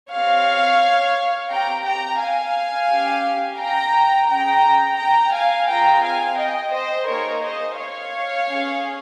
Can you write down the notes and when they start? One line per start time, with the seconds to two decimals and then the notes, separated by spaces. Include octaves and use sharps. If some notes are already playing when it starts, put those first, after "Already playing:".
0.11 C4 G4 C#5 F5
1.50 C4 G4 G5 A#5
1.85 G5 A#5
2.20 F5 G#5
2.90 C#4 G4
3.59 G5 A#5
4.29 C#4 G#4 G5 A#5
4.99 G5 A#5
5.34 F5 G#5
5.69 C4 F4 G#4 G5 A#5
6.03 F5 G#5
6.38 D#5 G5
6.73 C5 D#5
7.08 A#3 D#4 G#4 A#4 C#5
7.43 C5 D#5
7.77 C#5 F5
8.48 C#4 G#4